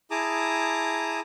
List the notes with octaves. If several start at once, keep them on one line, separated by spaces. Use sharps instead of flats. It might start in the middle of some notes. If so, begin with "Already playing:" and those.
E4 G#4 A5 A#5 D6 D#6